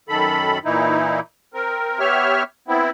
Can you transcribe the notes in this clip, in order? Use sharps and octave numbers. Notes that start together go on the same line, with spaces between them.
F#2 D#3 A4 B5
A#2 E3 D#4 E4
C4 A#4
B3 G4 C#5 E5 F6
B3 C4 E4